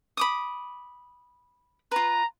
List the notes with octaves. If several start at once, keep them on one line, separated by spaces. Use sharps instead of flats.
B5 D6 D#6
F4 B4 A#5